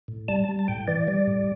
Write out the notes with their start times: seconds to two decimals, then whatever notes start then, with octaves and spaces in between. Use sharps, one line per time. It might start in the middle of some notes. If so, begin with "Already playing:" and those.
0.08 A2
0.28 G3 A5
0.44 A5
0.48 G3
0.59 A5
0.68 A2 G5
0.88 E3 D5
1.07 G3 D5
1.27 A2